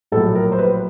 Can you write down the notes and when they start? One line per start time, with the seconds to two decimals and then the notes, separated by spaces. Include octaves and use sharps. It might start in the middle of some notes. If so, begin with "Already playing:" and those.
0.12 A#1 A2 F#3 A4
0.35 A#4
0.52 C5
0.59 B4